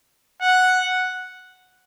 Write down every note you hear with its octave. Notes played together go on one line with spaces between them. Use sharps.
F#5